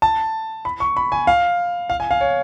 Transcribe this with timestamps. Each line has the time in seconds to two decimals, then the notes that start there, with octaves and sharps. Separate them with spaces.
0.02 A5
0.65 B5
0.80 C#6
0.97 B5
1.12 G#5
1.27 F5
1.90 F5
2.00 G#5
2.11 F5
2.21 C#5